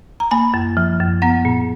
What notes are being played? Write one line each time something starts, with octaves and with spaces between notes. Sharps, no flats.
A#5
A#3 G#5 B5
F#2
F3
F#2
B3 F#5 A#5
A#2